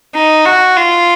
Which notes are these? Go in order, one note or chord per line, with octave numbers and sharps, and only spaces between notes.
D#4
F#4
F4